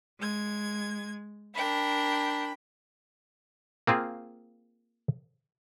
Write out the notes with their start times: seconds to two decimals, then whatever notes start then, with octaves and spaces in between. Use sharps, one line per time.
0.20 G#3 G#6
1.55 D4 A#4 G5 B5
3.87 A#3 C4 F4 G#4